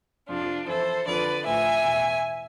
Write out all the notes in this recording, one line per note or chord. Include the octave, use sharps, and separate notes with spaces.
F2 C3 F3 D4 F4
F2 E3 A4 C5
F2 D3 F3 B4 D5
A2 F3 E5 G#5
E2 B2